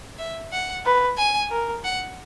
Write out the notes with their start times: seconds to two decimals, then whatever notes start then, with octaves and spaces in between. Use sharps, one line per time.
0.18 E5
0.52 F#5
0.85 B4
1.17 G#5
1.51 A#4
1.84 F#5